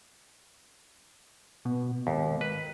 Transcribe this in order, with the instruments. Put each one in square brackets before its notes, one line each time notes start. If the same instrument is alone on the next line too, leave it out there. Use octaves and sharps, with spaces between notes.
[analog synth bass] B2
[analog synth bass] G#1 [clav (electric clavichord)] D#2
[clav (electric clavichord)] B4